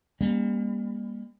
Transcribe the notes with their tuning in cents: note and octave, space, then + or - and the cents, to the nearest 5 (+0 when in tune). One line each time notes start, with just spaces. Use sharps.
G3 +40 A#3 +25 C#4 +0